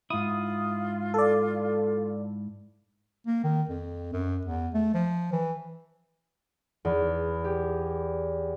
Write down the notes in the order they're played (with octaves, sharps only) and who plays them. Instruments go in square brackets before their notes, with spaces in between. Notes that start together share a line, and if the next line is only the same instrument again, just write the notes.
[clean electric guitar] G#2 E4 [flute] F4 [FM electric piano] D#6
[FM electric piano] A4 D5
[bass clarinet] A#3
D#3
F2
F#2
E2
A3
F3
E3
[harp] E2
G4